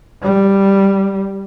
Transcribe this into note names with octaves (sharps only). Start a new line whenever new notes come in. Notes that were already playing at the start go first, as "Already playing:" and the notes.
G3